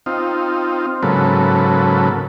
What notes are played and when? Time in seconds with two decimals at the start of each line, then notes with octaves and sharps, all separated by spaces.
0.06 C4 D#4 F4
1.03 G#2 C#3 F#3 A#3 A4 B4